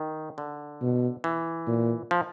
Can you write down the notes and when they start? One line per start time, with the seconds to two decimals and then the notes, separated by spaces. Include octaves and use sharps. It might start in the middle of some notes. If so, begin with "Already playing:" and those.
Already playing: D#3
0.38 D3
0.81 B2
1.24 E3
1.67 A#2
2.11 F3